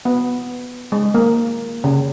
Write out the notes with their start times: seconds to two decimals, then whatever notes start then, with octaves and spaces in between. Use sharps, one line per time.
0.05 B3
0.92 G#3
1.14 A#3
1.84 C#3